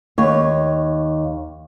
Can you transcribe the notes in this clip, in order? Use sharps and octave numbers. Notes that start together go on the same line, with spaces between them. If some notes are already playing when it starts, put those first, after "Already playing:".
D#2 C#5